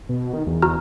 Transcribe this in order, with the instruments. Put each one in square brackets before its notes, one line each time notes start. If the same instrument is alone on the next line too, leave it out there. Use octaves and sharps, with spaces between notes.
[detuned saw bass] B2
D#3
E2
[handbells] F#4 A#5 F6